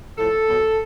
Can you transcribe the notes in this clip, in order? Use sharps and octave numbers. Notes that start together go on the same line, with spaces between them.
A2 F3 A4
B2 F#3